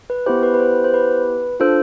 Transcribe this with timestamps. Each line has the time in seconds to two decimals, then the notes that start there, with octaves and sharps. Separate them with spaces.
0.10 B4
0.26 B3 E4 G4 C5
0.43 B4
0.54 B4
0.60 C5
0.84 C5
0.94 B4
1.60 D4 F4 A4 C5